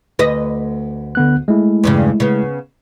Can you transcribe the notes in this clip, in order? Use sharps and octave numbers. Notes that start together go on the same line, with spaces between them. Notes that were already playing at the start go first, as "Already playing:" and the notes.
D2 B4 D#5
D3 B3 F#6
G#3 A3 E4
E2 G2 C#3
C#3 B3